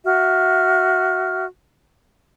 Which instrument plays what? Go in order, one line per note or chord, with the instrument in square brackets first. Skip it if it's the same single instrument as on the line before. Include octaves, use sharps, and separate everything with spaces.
[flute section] F#4 E5 F6